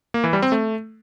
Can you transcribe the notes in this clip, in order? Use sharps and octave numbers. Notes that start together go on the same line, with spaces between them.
A#3
E3
G3
C4
A3